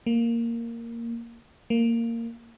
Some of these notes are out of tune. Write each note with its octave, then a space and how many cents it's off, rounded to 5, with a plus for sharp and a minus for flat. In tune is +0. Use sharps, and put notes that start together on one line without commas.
A#3 -5
A#3 -15